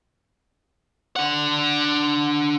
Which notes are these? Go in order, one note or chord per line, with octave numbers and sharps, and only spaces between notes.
D4 F#5